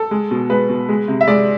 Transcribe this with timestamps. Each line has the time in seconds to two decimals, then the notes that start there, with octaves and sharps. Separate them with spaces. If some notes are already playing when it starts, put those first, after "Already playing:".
Already playing: A4
0.11 G#3
0.31 B2
0.49 G#3 B4
0.69 B2
0.89 G#3
1.08 C3
1.21 E5
1.27 G#3 D5